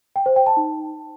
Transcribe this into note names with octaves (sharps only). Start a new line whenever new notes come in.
G5
C5
G5
A5
D#4